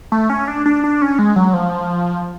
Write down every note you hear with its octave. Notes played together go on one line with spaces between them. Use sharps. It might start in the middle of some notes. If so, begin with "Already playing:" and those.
A3
C#4
D4
D4
D4
C#4
G#3
F#3
F3